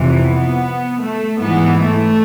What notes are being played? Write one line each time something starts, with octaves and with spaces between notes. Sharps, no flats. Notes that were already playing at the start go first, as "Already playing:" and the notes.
Already playing: F2 C3 E3
B3
A3
G#2 E3 B3
A3